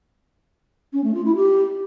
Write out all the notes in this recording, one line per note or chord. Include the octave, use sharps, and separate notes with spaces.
C#4
A3
F4
E4
G4